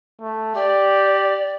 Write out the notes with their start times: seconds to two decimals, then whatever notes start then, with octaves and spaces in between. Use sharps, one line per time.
0.21 A3
0.55 G4 D5